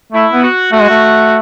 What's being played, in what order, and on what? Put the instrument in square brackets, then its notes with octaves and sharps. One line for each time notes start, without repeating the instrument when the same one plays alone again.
[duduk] A3 [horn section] E4
[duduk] B3
[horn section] F#4
[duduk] A3 [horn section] F#4
[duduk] G#3
A3